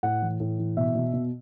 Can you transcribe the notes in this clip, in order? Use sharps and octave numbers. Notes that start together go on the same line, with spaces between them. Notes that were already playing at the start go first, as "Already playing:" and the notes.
A2 F#5
E3
A2
E3
B2 E5
B2
B2